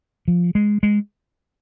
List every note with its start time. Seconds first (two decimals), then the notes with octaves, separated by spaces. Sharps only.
0.28 F3
0.55 G#3
0.83 G#3